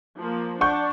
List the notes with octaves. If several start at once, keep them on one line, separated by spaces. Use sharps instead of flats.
F3 A#3
D4 F#5 C#6 G6